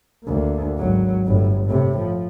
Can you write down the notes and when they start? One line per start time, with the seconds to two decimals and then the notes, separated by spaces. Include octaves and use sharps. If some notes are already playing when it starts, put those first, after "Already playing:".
0.24 D2 A#3
0.78 G#1 F#3
1.26 G1 A2
1.65 A2 C3
1.98 F3